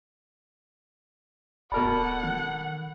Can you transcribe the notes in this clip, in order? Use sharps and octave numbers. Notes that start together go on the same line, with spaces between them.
D1 B2 A4 A#4 D5 F#5 A5 B5
D#3